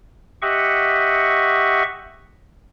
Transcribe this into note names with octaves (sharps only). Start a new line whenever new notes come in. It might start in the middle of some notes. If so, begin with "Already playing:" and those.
G4 D#5 E5 F#5 C#6